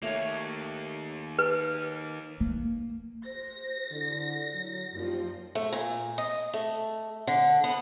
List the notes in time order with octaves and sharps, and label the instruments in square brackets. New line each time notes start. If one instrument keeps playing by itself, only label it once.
[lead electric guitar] D#3 A#3 [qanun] A3 C#5 D#5
[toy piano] B4
[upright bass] A#3
[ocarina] C5 [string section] A#6
[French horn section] D3 [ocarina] E4
[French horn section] F#3
[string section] F#2 F3 [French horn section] G3 A#3 D#4 [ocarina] F4
[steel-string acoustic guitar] A3
A#2
D#5
A3
D3
B3